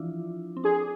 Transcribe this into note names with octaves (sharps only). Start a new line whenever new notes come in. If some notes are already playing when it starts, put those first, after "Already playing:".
Already playing: E3 F3 D4 E4 F4
C4
D4 G#4